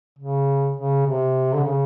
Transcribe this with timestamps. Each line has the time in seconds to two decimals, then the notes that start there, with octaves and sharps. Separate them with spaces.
0.19 C#3
0.76 C#3
1.06 C3
1.54 D3
1.63 C#3